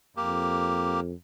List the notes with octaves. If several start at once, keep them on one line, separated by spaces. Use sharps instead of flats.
F2 A#3 G4